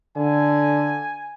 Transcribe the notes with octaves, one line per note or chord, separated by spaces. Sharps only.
D3 G#5